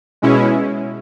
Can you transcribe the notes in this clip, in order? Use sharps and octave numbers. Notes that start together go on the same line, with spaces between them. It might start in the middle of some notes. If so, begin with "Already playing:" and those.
B2 G#3 C#4 E4